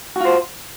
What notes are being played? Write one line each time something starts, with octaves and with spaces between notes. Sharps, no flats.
F4 F#4 C5